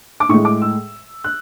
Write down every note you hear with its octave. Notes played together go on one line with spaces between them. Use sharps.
D6
A2 G#3 C#6
D6
E6
F#6